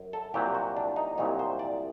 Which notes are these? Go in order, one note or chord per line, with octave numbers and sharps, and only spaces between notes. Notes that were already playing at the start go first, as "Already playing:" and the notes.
Already playing: F#2
A4
C2 A#2 F#3 G4
F#4
D4
D#4
C2 A#2 F#3 D#4
C5
D5